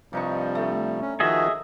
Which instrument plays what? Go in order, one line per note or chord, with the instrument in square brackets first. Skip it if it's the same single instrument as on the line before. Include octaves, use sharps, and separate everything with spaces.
[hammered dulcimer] G2 D#4 C#6 [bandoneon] C3 F3 G3
[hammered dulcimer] A3
[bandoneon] C#4
[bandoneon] D#3 F3 F#4 [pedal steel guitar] G#4 D#5 E5